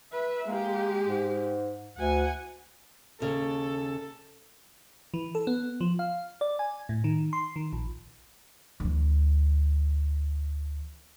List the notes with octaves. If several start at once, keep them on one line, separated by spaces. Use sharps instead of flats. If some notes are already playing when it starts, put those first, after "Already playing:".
B4 E5
G#3 A#3 G4
G#2
D2 F#5 G#5
D#2 C#3 A4
E3
A4
B3
F3
F5
D5
G#5
A2
D#3
C6
D#3
A#1
D2 E3